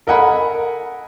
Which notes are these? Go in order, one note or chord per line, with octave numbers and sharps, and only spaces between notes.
A4 A#4 D#5 F#5 G#5 B5